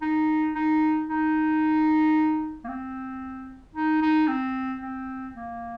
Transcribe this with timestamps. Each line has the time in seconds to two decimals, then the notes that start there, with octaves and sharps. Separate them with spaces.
0.02 D#4
0.55 D#4
1.09 D#4
2.65 A#3
2.68 C4
3.75 D#4
4.02 D#4
4.28 C4
4.81 C4
5.35 A#3